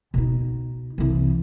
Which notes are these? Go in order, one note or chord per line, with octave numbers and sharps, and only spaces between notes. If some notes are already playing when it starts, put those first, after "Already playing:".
B2 D#4
C2 E3